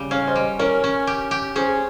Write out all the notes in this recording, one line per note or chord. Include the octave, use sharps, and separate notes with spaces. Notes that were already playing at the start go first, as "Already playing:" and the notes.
Already playing: C#3 G3
C#4 C#5 F5
C5 D#5
G3
C#4 A#4 C#5
C#4
G4
G4
C#4 G#4 C5